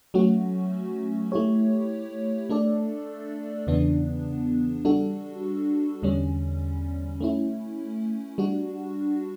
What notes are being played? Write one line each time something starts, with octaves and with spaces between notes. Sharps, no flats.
F#3 A3 C#4 F#4
A3 E4 G4 C#5
A3 D4 A4 D5
E2 C#3 E3 B3 D4
G3 D4 F#4 A4
E2 D3 G3 C#4
A3 C#4 E4
G3 D4 F#4